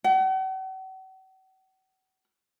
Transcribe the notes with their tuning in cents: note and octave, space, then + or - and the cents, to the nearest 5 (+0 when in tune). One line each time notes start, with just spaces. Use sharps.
F#5 +45